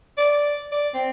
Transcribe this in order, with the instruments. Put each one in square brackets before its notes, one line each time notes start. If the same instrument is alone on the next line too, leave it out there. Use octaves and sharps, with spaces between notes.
[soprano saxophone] D5
D5
C4